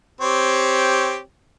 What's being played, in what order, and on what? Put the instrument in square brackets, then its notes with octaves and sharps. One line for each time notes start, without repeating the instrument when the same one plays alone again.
[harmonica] C4 G4 C#5